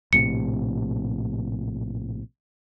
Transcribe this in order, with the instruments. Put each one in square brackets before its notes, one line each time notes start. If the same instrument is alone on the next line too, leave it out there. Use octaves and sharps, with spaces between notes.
[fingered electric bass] A#1 A2 C3 [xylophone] C#7